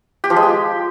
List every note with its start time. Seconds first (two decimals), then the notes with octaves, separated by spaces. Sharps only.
0.24 G4
0.30 F3
0.36 G#3
0.43 G4